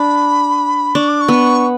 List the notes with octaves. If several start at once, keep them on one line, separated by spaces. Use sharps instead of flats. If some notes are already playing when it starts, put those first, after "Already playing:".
Already playing: D4 B5
D4 C#6
D6
C#6
B3